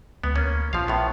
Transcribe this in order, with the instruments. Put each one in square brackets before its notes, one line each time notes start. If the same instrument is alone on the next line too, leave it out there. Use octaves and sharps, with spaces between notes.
[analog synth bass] D2 [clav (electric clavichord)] B3
[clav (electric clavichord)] A#3 C#4
[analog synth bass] A#1 [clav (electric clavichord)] F3 F5
[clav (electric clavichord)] A2 B3